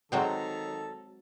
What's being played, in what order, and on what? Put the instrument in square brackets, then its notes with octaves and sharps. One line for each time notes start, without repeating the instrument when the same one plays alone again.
[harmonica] D#3 A4 A#5 [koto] F#3 G#3 C4